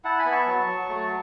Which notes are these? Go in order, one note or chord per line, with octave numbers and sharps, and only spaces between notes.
E4 F#5 A5
G#5 B5
B3
A5 C#6
F#3
F#3
A3